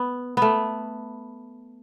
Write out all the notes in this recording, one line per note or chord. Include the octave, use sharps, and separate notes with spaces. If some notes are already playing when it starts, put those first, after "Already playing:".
Already playing: B3
A3 B3